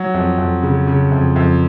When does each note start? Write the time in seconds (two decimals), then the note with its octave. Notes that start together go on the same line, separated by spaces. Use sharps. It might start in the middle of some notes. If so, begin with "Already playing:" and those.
Already playing: F#3
0.14 F2
0.38 F2
0.63 C#3
0.87 C#3
1.12 F2
1.36 F2